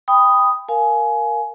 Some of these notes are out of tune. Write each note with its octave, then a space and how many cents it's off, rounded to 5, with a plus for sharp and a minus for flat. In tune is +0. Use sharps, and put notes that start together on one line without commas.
G5 +15 B5 +10 D#6 +0
A#4 +0 F5 +0 G#5 +20